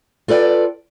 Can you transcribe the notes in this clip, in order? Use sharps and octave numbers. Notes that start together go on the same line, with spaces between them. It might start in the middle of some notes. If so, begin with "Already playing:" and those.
F4 A4 B4 D5 G5